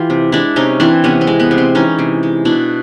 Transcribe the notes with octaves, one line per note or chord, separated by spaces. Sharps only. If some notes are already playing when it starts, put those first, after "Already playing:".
Already playing: E3 F4 G4
C3
G#3 D4 E4
C3 C#4 D#4
E3 C4 D4
C3 B3 C#4
C4
G#3
B3
C3
C4
E3 C#4 D#4
C3
G#3
B2 D4 E4